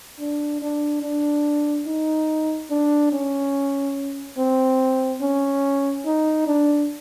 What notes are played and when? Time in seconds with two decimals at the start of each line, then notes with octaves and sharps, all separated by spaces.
0.20 D4
0.62 D4
1.03 D4
1.86 D#4
2.70 D4
3.12 C#4
4.37 C4
5.21 C#4
6.05 D#4
6.47 D4